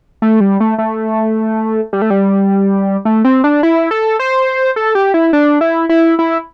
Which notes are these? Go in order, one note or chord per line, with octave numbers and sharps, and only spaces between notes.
A3
G3
A3
A3
G3
A3
G3
A3
C4
D4
E4
A4
C5
A4
G4
E4
D4
E4
E4
E4